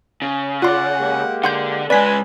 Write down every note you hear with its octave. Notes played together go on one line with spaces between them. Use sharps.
C#3
F4 D5 F#5 C6
G#3 A#3 G4
D3 F#5 C6 G6
C#3 G#3 B4 D5 G#5 B6